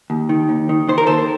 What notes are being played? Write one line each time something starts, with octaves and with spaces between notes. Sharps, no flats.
D#2
D#3
D#2
D#3
D#3 C5
A#4
D#2 A4 C5